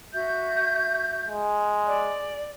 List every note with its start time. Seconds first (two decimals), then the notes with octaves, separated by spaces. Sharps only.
0.14 F#4 E5 G6
1.27 G#3
1.86 D5